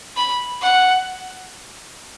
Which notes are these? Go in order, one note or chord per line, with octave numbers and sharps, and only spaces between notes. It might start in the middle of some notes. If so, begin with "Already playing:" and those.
B5
F#5